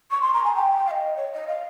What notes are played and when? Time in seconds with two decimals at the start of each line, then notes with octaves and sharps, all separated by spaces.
0.11 C#6
0.21 C6
0.33 A#5
0.44 G#5
0.55 G5
0.86 F5
0.91 D#5
1.17 C#5
1.33 D#5
1.47 F5